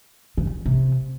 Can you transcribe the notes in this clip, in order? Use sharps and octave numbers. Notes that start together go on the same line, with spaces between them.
C#3
C3